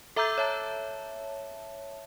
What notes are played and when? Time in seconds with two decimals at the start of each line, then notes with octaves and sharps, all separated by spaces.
0.16 A4 E5 A#5 D6 E6 G6
0.38 C#5 E5 A5